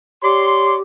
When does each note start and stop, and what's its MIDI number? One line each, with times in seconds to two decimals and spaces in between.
0.23 0.82 67
0.23 0.75 73
0.23 0.75 74
0.23 0.75 84